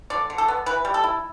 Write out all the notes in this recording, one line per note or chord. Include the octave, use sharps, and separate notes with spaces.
D3 D5
D3
A4
B3
E3 B4
G3
A4
E4